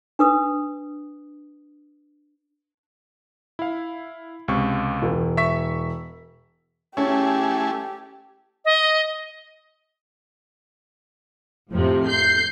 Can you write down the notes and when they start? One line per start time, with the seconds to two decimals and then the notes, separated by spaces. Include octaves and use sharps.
0.19 D4 B4 D#6
3.59 E4 F5
4.48 C#2 C3 C#6
5.02 E1
5.37 E5 C#6 B6
6.97 A3 C#4 E4 G4 G#4
8.65 D#5
11.72 F2 A2 C3 F3
12.06 G6 C7